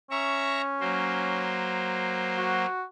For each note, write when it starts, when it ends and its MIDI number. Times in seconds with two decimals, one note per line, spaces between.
0.11 1.60 61
0.11 0.61 76
0.11 0.61 82
0.11 0.61 85
0.80 2.66 54
0.80 2.66 58
0.80 2.66 72
2.37 2.83 66